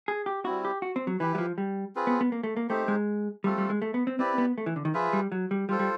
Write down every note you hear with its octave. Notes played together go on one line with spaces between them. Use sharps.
G#4
G4
G3 C4 E4 F#4
G4
F#4
C4
F#3
E3 E4 G4 B4
F#3
F3
G3
C4 F4 G#4 B4
B3
B3
A#3
A3
A#3
A3 C4 D#4 G4 C5
G#3
G3 A3 C4 F4 A4
G3
G#3
A3
B3
C4
C4 E4 G4 B4 D5
B3
A3
E3
D3
D#3
F3 F4 G#4 B4 E5
G3
F#3
G3
G3 F4 A4 C5
G3